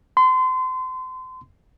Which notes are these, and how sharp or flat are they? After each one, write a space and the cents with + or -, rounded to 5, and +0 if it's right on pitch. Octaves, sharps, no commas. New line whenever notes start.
C6 -30